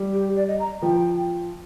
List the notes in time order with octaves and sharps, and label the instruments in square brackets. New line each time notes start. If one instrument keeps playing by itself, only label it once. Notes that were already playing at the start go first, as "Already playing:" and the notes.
Already playing: [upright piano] G3
[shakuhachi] G4
D5
D#5
A#5
[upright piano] F3 [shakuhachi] G5